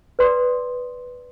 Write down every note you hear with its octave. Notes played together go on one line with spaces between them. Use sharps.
B4 D5 C6 D#6